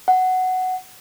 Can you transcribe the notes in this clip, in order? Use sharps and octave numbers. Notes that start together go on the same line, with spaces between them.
F#5